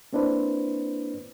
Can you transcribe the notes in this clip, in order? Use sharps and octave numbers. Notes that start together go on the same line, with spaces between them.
A#3 C4 D4 E4 B4 C5